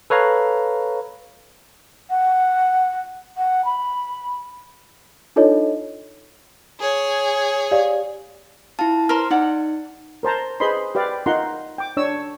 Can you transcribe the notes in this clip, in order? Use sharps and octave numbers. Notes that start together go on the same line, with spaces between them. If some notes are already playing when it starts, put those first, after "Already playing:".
A4 B4 C#5 F5 A#5
F#5
F#5
B5
D4 D#4 F4 A4 C#5 D#5
G#4 C#5
G4 D5 F5
E4 F4 A5
A#4 C5 C6 F6
D#4 D5 F#5 D6
A#4 C5 A5 A#5
G#4 B4 C5 D#5 B5 C6
G4 B4 D5 F5
D#4 F4 A#4 F#5 A#5 C6
G5 D6
D4 C#5 E6